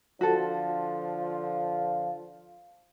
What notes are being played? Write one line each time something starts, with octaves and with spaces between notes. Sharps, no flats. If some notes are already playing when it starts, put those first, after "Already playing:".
D3 F3 F4 F#4 A4